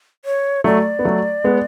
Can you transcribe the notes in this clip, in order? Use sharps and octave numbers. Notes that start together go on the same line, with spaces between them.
C#5
F#3 A3 D5
B3
F#3 A3
G#3 B3